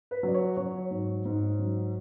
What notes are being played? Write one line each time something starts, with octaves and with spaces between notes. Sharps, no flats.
B4
F#3 D5
C#5
F#3 C#5
G#2
G#2
F#3